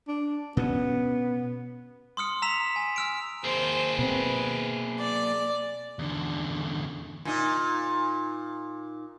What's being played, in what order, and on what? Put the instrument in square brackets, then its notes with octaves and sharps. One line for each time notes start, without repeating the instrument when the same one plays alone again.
[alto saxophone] D4
[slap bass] B2 C#4 [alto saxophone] B3
[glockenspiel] C6 D#6 F6 C#7
A#5 E6 B6 E7 F7
G#5
E6 F6 D7
[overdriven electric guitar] A#3 G#4 [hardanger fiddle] C5
[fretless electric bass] B2 C4 [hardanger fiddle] B4
[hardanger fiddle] D5
[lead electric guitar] E2 D3
[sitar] A#2 D#4